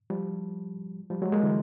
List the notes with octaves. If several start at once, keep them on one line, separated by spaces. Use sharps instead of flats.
F3 G3
F3 G3
F#3 G#3
G#3 A#3
D3 E3